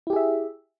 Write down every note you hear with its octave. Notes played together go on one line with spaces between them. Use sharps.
E4 G4 G#4 E5